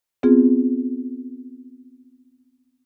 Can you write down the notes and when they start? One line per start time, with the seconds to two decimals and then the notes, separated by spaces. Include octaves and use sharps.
0.23 B3 C4 F4 G#4